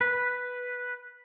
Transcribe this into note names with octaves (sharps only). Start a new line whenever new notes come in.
B4